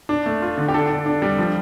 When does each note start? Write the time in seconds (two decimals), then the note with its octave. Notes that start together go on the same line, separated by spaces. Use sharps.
0.09 D4
0.26 A3
0.42 F4
0.57 D3
0.69 G4
0.74 D4 A4
0.90 D4
1.06 D4
1.22 G3
1.39 F3